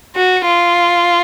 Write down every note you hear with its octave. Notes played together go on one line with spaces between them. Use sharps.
F#4
F4